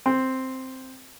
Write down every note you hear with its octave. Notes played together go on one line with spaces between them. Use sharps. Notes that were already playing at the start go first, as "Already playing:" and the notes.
C4